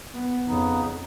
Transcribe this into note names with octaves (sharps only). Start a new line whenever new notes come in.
B3
F2 C#3 B3 D#4